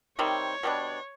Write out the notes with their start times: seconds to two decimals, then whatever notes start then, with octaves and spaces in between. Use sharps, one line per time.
0.18 C3 D#3 G3 C4 C#5
0.63 B2 G3 B3 D4